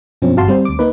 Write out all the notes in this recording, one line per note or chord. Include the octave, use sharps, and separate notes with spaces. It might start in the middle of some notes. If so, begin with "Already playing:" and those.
F#2 B2 F3 C4 C#4
G1 F#4 F5 A5 C6
G3 C4 C5
D2 D6
A#3 D#4 B4